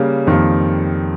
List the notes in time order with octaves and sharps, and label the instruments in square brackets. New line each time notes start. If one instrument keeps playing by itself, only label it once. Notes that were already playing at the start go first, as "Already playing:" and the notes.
Already playing: [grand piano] C#3 G3 A#3
F2 D#3 G3 A#3